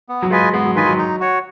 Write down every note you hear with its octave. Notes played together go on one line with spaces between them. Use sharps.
B3
F#3
G#3 F4 B4 D#5 G#5
G#3 B3
F#3
D#3 F4 B4 D#5 G#5
F#3
D#4
F#4 C#5